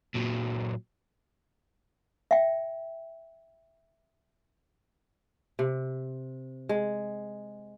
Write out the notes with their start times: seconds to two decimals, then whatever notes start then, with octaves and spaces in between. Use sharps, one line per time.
0.14 A#2 F#3
2.31 E5 G5
5.59 C3
6.69 G#3